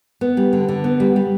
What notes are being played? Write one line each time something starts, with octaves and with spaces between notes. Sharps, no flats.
B3
G3
D3
D3
B3
G3
G3